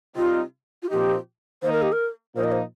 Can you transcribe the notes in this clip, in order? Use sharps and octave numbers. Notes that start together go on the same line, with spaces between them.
C3 G3 C4 D#4 F4
F4
A#2 F3 C4 D#4 G4
D#3 A#3 D#4 C5
A#4
G4
A#4
A#2 F3 A#3 D#4 C5
D#5
C5